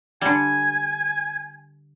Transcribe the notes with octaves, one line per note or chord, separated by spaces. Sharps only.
D3 G3 G#5